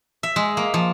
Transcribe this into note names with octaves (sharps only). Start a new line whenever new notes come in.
E5
G#3
A#3
F3